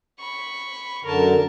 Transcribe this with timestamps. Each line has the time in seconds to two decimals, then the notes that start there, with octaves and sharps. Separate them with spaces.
0.20 B5 C#6
1.05 F#2 D3 A#4 A5